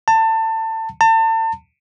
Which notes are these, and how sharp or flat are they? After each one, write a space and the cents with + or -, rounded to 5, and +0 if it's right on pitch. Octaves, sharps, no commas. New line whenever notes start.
A5 +25
A5 +35